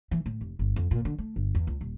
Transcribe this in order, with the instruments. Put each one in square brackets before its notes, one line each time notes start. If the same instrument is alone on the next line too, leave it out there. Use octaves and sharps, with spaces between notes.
[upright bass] E3
A2
F1
G1
F2
A#2
D3
A3
G1
E2
C#2
D#1